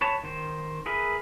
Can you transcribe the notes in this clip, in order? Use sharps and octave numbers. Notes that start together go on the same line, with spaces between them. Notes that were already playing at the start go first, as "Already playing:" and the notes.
B4 C#5 A5
D#3 C5
G#4 A#4 B4 E5